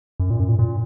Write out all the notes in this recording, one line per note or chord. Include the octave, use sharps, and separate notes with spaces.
F#2
A#2
F#2
A#2
A#2